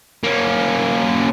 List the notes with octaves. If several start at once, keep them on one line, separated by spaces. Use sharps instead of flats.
A#3 C#4